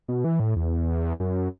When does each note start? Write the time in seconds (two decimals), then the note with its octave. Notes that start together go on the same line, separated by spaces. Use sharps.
0.08 B2
0.24 E3
0.40 A2
0.56 E2
1.20 F#2